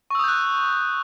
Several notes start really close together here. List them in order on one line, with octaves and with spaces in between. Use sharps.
C#6 E6 D#6 G6 F#6